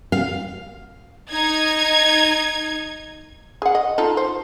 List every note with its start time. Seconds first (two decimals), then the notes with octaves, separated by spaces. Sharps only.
0.12 F5
1.31 D#4 G#6
3.62 G#4 F#5
3.75 D#5
3.98 D#4 F4 A4
4.17 C5